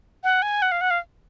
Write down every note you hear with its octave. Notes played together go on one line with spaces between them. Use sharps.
F#5
G#5
F#5
F5
F#5
F5